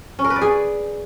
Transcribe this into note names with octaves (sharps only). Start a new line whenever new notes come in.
C#4
A#4
B4
D5
G#4